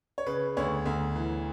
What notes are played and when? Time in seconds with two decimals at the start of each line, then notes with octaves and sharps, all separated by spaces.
0.18 C#5
0.26 C#3 B4
0.57 D2 C#5
0.85 D2
1.16 E3